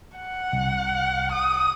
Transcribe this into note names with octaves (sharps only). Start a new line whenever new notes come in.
F#5
C2
D#6